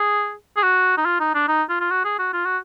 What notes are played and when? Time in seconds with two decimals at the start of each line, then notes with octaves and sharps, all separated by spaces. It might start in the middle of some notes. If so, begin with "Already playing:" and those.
Already playing: G#4
0.57 G#4
0.63 F#4
0.97 D#4
1.06 F4
1.20 D#4
1.34 D4
1.48 D#4
1.70 F4
1.81 F4
1.91 F#4
2.05 G#4
2.19 F#4
2.33 F4
2.46 F#4